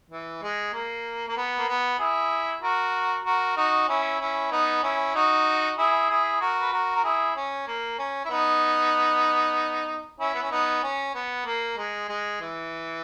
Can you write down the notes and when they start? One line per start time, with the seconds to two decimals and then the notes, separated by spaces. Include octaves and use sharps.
0.11 E3
0.42 G#3
0.73 A#3
1.28 A#3
1.37 B3
1.58 A#3
1.68 B3
1.99 E4 G#4
2.63 F#4 A#4
3.25 F#4 A#4
3.57 D#4 F#4
3.89 C#4 E4
4.20 C#4 E4
4.52 B3 D#4
4.83 C#4 E4
5.15 D#4 F#4
5.78 E4 G#4
6.09 E4 G#4
6.41 F#4 A#4
6.61 B4
6.72 F#4 A#4
6.95 A#4
7.04 E4 G#4
7.36 C#4
7.68 A#3
7.99 C#4
8.25 E4
8.30 B3 D#4
10.20 C#4 E4
10.35 B3
10.43 C#4
10.51 B3 D#4
10.83 C#4
11.15 B3
11.46 A#3
11.77 G#3
12.09 G#3
12.41 E3